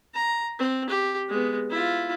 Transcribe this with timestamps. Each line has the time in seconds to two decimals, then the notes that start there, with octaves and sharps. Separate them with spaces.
0.15 A#5
0.59 C4
0.90 G4
1.29 G#3 B3
1.70 E4 F4